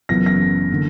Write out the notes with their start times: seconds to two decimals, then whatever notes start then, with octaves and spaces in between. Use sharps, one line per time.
0.09 F#1 F#2 C#3 E3 B3 A#6
0.26 A#6
0.70 D3 A#3